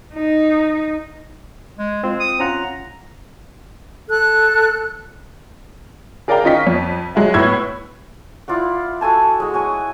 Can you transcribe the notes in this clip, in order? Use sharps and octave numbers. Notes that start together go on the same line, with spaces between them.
D#4
G#3
G#3 C4 F4
D#6
C#4 F4 F#5 A#5
A4 F#6
G#4 A#4 D5 F5 G5 A#5
D#3 C#4 F4 D#5 C#6 B6
F2
F#3 G#3 F#4 E5
A2 B3 C#5 C#6 E6 G#6
E4 F4 D5 F#5
F#4 A4 G#5 A5
G#3 F#4
F#4 C#5 G#5